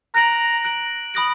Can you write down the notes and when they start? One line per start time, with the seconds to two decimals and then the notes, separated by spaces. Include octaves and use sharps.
0.15 A#5 F#6 D7 F#7
0.65 F#6 D7 F#7
1.14 B5 D#6 F#6 A#6 D7